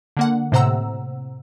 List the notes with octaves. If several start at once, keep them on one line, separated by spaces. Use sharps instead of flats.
D3 A#3 F#5
A2 C3 C5 F#5 A#5 E6